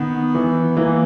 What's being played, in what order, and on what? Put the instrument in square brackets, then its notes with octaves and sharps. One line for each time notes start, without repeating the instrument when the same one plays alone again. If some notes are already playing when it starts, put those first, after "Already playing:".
Already playing: [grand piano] D#3 [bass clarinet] B3
[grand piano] E3
[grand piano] E3 [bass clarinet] A#3